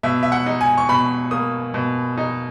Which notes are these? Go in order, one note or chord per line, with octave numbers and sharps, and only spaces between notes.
B2 E5
E5
F#5
D#4
G#5
C#6
B2 B5
A#3 D#6
B2
D#4